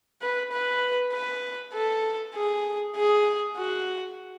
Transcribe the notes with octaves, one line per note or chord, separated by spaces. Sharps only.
B4
B4
B4
A4
G#4
G#4
F#4